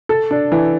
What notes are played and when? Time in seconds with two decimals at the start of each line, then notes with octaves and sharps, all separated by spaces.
0.09 A4
0.31 D4
0.52 E3